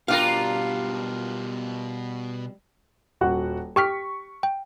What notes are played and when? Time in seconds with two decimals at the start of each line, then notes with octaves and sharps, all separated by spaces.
0.08 B2 G3 D4 F4 G4 A#4 F5
3.21 D#1 F#4 F#5
3.76 G4 G5 C#6 F6 B6
4.43 G5